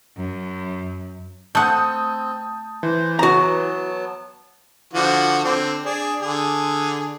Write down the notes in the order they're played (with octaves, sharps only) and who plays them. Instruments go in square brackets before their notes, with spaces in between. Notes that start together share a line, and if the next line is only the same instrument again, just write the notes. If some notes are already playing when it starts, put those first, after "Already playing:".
[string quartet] F#2
[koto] A3 F#5 [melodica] C4 [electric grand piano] A5 D#6 G6
[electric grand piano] E3 [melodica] C5
[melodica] F#3 B3 A5 [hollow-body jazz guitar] F#4 A#5
[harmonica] D3 F3 F#4
D3 C4
D4 G#4
D3 G#4